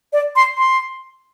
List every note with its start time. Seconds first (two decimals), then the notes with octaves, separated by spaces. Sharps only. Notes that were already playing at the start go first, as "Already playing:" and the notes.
0.13 D5
0.36 C6
0.58 C6